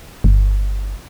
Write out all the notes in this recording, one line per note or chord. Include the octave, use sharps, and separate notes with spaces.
G1